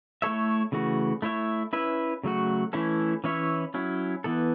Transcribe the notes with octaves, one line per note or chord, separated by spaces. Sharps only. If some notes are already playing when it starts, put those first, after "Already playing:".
A3 E4 A4 C#5 E5
C#3 E3 A3 F#4
A3 E4 C#5 E5
C#4 E4 B4 E5
C#3 F#3 A3 F#4
E3 A3 C#4 E4 A4
E3 C#4 E4 C#5 E5
F#3 C#4 E4
E3 B3 A4